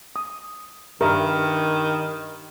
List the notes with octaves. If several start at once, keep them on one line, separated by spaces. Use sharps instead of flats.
D#6
G2 D#3 A#4 E5